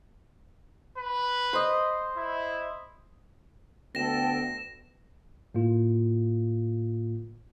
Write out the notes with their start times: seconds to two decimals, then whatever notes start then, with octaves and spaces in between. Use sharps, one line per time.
0.98 B4
1.53 C5 D#5
2.17 E4
3.95 D2 B3 A4 G5 A#6 E7
5.55 A2 A#3 F4